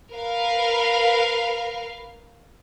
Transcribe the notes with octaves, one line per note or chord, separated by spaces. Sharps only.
A#4 B4 F5